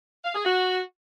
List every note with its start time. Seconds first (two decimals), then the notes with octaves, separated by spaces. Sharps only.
0.24 F5
0.34 G#4
0.45 F#4